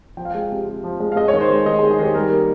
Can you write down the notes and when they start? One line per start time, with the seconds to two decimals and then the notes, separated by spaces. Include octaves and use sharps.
0.17 F3 G5
0.25 F5
0.32 G#3 G5
0.51 C3
0.68 C3
0.84 F3
1.00 G#3
1.12 F5
1.16 G#3 D#5
1.28 C#5
1.33 D#3
1.41 C5
1.50 G#3
1.66 D#3 D#5
1.79 G#4
1.83 G#3
1.91 G#4
1.99 D#3 G4
2.14 G3 A#4
2.32 A#3